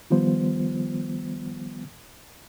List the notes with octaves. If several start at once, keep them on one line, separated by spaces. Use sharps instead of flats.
D#3 F3 G3 B3 F4 C5